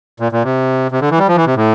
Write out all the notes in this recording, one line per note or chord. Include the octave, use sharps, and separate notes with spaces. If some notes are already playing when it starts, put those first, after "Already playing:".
A#2
A#2
C3
C3
D3
E3
G3
F3
E3
C3
A2